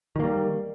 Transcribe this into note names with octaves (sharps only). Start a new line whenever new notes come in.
D#3 G3 A#3